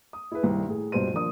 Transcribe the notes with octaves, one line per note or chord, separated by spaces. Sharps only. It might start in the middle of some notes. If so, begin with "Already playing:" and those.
D#6
E4 G#4 B4
C2 G2 D#3
A2 G#4
C#2 G2 B2 G4 C5 D#7
D#1 F3 A#3 D4 D#6